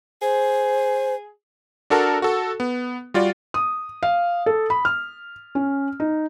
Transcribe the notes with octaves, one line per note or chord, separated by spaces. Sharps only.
G#4 C5
D4 F#4 A4 A#4 A5
F#4 A4
B3
G3 F4 F#4 D5
D#6
F5
A4
B5
F6
C#4
D#4